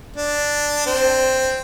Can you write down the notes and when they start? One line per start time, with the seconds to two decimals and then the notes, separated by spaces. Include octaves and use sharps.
0.17 D4
0.86 C4